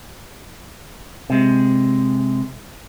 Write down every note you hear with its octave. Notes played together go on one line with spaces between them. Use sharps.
C3 G#3